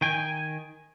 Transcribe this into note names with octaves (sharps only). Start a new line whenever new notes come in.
D#3 G5 G#5